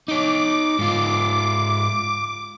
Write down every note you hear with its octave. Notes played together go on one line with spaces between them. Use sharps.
D#4 C#5 D6
G#2 F4